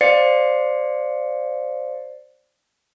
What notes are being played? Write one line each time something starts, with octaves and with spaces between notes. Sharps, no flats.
C5 D5 F5 A6 C7 C#7